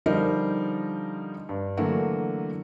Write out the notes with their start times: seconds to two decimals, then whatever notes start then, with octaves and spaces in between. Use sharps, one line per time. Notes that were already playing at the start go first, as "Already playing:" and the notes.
0.06 D3 F3 G3 D#4 A#4 C5
1.49 G2
1.77 D3 E3 F#3 A3 A#3 F#4